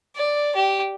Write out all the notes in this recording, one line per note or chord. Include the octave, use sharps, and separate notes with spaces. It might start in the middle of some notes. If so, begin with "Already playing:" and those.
D5
G4